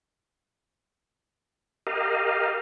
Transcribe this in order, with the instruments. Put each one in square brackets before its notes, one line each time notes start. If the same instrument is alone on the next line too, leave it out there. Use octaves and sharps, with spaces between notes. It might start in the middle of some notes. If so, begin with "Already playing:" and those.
[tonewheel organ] G4 A#4 D#5 F5